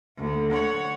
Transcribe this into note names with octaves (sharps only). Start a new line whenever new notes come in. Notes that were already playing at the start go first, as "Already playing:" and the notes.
D2 D3
C#5 F#5